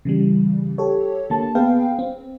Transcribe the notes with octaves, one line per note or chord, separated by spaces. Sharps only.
C#3 E3 G3
G4 A4 C#5
D3 A#3 A5
B3 G#4 B4 F5 G5
C4